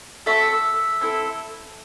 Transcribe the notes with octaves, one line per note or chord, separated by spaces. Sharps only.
C4 F#4 A4 E5
C4 E4 A4